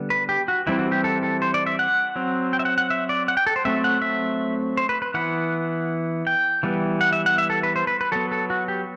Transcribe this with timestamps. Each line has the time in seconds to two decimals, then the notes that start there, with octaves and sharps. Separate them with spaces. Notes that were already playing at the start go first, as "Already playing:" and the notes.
Already playing: D3 G3 B3
0.10 B4
0.29 G4
0.48 F#4
0.67 E3 G3 C4 E4
0.79 F#4
0.92 G4
1.04 A4
1.23 A4
1.42 C5
1.54 D5
1.66 E5
1.79 F#5
2.16 F#3 C4
2.53 G5
2.59 E5
2.65 F#5
2.78 F#5
2.90 E5
3.09 D5
3.28 F#5
3.37 G5
3.47 A4
3.56 C5
3.65 F#3 A3 C4 E5
3.84 F#5
4.02 E5
4.77 C5
4.89 B4
5.02 B4
5.14 E3 B3 F#5
6.27 G5
6.63 E3 G3 B3
7.01 F#5
7.13 E5
7.26 F#5
7.38 E5
7.50 A4
7.63 B4
7.76 C5
7.87 B4
8.01 B4
8.12 F#3 B3 A4
8.31 A4
8.50 F#4
8.68 G4